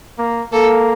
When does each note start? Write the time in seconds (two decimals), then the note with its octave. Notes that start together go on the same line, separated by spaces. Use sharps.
0.19 A#3
0.53 A#3 A4